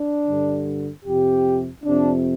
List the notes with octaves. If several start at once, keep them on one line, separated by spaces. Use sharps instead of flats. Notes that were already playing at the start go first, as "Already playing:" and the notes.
Already playing: D4
G2 D3
F2 C3 G4
F2 C3 D4